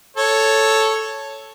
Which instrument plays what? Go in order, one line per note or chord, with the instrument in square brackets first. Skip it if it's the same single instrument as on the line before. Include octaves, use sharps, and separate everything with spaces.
[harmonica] A4 C#5